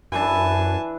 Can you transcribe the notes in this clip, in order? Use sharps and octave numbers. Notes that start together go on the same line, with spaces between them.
F#2 E3 D4 G#5 A5